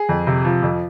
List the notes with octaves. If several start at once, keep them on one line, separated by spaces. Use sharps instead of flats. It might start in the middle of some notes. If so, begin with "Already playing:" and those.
Already playing: G#4
F2
C3
F3
F2